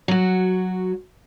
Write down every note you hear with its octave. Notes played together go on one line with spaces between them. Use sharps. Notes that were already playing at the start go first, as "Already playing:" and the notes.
F#3 F#4